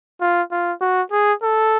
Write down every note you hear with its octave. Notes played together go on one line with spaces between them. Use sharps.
F4
F4
F#4
G#4
A4